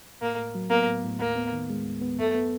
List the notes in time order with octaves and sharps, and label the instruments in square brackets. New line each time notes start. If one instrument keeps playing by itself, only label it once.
[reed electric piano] A2 [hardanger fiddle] A#3
[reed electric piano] A2
F#3
[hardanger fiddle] A#3 [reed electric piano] B3
[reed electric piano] A2
A2
[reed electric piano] D#2 [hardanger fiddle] A#3
[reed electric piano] B3
D#3
G#3
D#2
B3
[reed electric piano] F#2 [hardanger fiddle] A3
[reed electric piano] B3